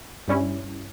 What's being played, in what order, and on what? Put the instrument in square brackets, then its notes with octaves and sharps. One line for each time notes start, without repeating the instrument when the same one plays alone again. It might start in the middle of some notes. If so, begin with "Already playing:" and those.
[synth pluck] G2 G3 C#4 E4